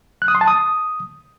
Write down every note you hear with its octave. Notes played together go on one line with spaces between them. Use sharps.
F#6
D#6
C6
A5
D#6